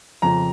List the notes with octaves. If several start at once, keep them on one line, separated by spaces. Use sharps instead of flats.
F2 C#3 F3 A#5